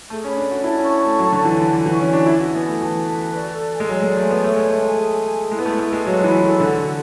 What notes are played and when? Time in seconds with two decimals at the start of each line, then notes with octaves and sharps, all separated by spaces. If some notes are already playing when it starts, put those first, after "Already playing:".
0.10 A3 G#4
0.24 C#4
0.28 B5
0.37 D4
0.46 D5
0.51 F#4
0.64 E4 A5
0.78 C#4
0.82 C#6
1.00 A3 A5
1.19 F#3 A4
1.32 D3
1.36 A4
1.45 E3
1.54 A4
1.60 D3
1.72 E3 F#5
1.86 E3
1.91 C#6
2.00 C#4
2.09 D4 F#4
2.26 E4 D5
2.40 F#4
2.44 G#5
2.54 B3
2.63 A3 G#5
2.81 E3 A5
2.99 B4
3.17 F#4
3.35 D5
3.53 A4
3.71 G#5
3.80 G#3
3.89 F#3 G#5
4.03 G#3
4.07 D5
4.17 A3
4.26 B3 G#5
4.44 A3 C#5
4.56 G#3
4.61 G#5
4.70 A3
4.79 G#5
4.97 G#4
5.16 G#5
5.33 G#4
5.51 G#3 E4
5.59 B3
5.65 A3
5.70 D5
5.79 A3
5.88 G#3 A4
6.05 F#3 F#4
6.24 E3 B5
6.42 E3 A4
6.60 D3 F#4
6.78 F#4